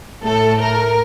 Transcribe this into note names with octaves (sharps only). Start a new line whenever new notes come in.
A2 A3 A4
A#4